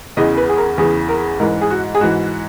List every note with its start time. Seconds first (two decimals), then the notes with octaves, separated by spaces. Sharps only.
0.17 E2 C#3 E3 D#5
0.37 B4
0.49 G#4
0.58 A#4
0.78 E2 C#3 E3 G#4
1.09 A#4
1.39 G#2 E3 A#4
1.61 G#4
1.70 F#4
1.95 G#4
2.01 G#2 E3 F#4